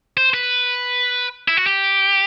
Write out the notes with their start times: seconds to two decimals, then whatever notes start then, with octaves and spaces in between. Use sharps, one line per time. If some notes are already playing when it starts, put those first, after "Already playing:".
0.17 C5
0.34 B4
1.48 E4
1.57 F#4
1.66 G4